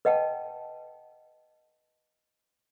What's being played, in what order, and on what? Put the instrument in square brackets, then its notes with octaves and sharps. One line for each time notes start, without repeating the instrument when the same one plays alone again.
[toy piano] B4 D#5 F#5 G5 A5